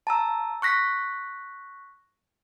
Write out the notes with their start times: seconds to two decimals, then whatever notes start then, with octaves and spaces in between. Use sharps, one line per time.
0.07 A5 A#5 E6
0.62 C#6 F#6 A#6 B6